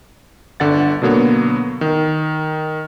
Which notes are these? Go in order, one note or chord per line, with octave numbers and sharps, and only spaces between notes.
G1 D3 F#5 A6
B2 D3 F#3 A#3 B3
D#3